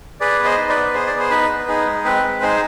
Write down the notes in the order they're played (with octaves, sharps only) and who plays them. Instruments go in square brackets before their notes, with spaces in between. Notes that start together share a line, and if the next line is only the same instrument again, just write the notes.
[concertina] G#4 B4 D5
B3
C5 D#5
D#4
B4 D5
B3
G#4 C5
D5
B3
C5
D#4 B4
B3
D#4 G#4
G#3
C4 B4
G#3
D#4 G#4 C5